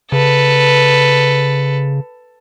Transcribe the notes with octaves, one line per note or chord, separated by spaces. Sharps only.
C#3 A4 B4